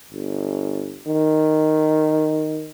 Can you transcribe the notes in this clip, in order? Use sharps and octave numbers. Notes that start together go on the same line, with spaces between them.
G1
D#3